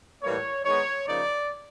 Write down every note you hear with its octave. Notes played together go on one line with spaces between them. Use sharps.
A2 E3 G3 A#3 C#5
D#3 G#3 B3 D#4 C#5
C#3 F3 A#3 D#4 D5